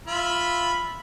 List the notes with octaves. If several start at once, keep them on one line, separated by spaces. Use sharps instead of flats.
F4 E5 B5